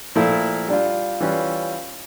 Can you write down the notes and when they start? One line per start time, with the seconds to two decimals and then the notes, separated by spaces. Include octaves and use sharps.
0.16 A#2 F3 A3 E4
0.68 G3 D4 F4
1.20 E3 G3 C#4 F4